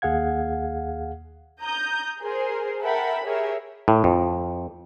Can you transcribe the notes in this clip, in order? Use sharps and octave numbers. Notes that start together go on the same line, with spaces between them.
D#2 G#4 F5 F#5 G#6
A#5 D#6 G6
G#4 A#4 C5
A4 A#4 E5 F#5 G5 B5
G4 G#4 A#4 C#5 E5
A2
F2